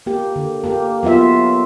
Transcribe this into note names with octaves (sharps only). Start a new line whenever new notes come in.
A#3 G4
D3
A#3 G4
F#3 B3 F4 E5